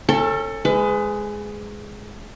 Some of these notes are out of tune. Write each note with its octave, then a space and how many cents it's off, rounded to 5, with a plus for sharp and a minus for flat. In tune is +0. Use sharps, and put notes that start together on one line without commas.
C#4 -25 A4 +20
G#3 +5 B4 +30